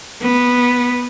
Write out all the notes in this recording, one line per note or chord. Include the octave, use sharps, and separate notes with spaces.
B3